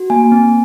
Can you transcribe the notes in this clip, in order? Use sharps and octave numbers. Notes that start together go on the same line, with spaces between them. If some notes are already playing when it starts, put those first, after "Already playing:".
Already playing: F#4
A#3 G#5
C4